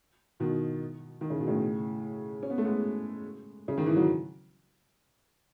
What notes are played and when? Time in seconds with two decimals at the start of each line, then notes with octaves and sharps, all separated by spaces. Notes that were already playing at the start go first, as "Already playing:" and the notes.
0.40 B2 D#3
1.21 D#3
1.30 C#3
1.39 B2
1.47 A2 C#3
2.43 C#4
2.50 B3
2.58 A3
2.65 G#3 B3
3.68 C#3
3.78 D#3
3.86 E3
3.96 F#3